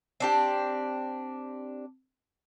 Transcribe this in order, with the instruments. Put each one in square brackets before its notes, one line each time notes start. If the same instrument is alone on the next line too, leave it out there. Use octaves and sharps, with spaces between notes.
[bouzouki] C4 D4 G4